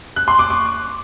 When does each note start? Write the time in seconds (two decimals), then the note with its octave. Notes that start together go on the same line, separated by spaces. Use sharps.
0.16 F#6
0.28 C6
0.39 D6
0.50 C#6